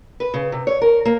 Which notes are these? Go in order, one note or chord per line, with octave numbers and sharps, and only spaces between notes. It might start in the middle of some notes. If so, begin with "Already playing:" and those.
B4
C#3
C3
C#5
A#4
A#3